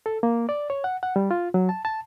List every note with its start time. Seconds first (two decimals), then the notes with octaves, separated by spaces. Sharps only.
0.06 A4
0.23 A#3
0.49 D5
0.70 C#5
0.84 F#5
1.03 F#5
1.16 G3
1.31 F4
1.54 F#3
1.69 A5
1.85 A5